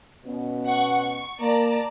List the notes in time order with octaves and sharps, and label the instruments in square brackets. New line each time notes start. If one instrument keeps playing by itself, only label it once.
[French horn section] B2 C#4
[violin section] F#5 C#6
C#6
[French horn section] A#3 [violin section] D5 A5 A#5